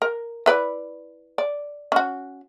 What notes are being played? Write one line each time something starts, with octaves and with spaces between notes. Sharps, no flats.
A#4
E4 B4 D5
D5
C#4 F#4